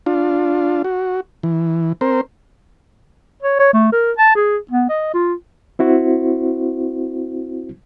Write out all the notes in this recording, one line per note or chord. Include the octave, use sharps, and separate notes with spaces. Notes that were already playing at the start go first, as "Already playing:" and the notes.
D4 F4
F#4
E3
C4 A#4 C5
C#5
C#5
A3
A#4
A5
G#4
B3
D#5
F4
C4 E4 F#4 C5